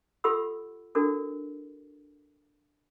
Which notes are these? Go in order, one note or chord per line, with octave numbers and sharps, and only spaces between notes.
F4 G4 A4 F#5 B5 E6
D4 E4 F#4 A4 A#4